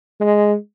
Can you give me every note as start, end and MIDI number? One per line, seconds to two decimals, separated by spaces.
0.20 0.55 56